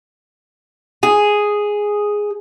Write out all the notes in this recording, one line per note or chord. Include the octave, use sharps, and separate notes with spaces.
G#4